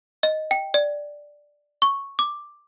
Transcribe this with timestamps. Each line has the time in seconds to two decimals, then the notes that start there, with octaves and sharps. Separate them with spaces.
0.23 D#5
0.51 G5
0.74 D5
1.82 C#6
2.19 D6